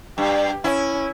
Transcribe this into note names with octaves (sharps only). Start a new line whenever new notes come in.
G2 G4
C#4 E4